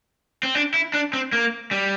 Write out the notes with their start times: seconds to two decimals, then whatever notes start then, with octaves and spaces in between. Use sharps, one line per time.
0.43 C4
0.55 D4
0.74 E4
0.94 D4
1.13 C4
1.33 A#3
1.71 G3